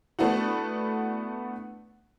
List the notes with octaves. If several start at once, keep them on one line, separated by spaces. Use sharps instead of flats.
A3 B3 D4 E4 F#4